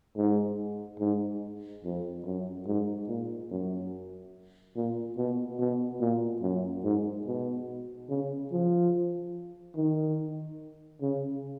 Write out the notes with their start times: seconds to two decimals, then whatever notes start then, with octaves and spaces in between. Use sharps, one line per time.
0.17 G#2
1.00 G#2
1.85 F2
2.26 F#2
2.67 G#2
3.09 A#2
3.51 F#2
4.76 A#2
5.17 B2
5.60 B2
6.01 A#2
6.42 F#2
6.84 G#2
7.27 B2
8.09 C#3
8.52 F3
9.76 D#3
11.02 C#3